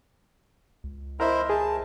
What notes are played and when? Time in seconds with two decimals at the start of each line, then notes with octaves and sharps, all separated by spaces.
0.84 C#2
1.20 E4 A#4 C5 D#5 E5
1.50 G#4 A5